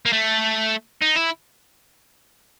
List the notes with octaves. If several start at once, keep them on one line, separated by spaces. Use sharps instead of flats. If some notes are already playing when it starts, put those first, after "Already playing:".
A#3
A3
D#4
E4